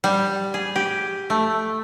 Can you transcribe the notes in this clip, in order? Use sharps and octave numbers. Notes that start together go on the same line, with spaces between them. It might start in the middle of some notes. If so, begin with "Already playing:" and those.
G3
G#4
G4
A3